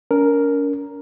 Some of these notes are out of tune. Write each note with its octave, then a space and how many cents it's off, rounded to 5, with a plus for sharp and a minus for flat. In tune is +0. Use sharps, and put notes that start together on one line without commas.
C#4 +45 A#4 +0